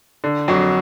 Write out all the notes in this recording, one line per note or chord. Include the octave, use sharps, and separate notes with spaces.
D3
F2 F#3 F#4